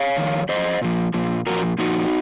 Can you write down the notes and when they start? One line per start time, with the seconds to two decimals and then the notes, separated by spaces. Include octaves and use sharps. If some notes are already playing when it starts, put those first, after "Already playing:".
Already playing: C#5 F5
0.16 F2 D#3
0.49 F2 D#3 C5 D#5
0.81 A#2 F3
1.14 A#2 F3
1.46 A#2 F3 F#4 A#4
1.78 A#2 F3 D#4 F#4